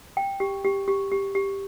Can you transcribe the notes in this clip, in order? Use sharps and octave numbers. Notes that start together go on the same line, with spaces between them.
G5
G4
G4
G4
G4
G4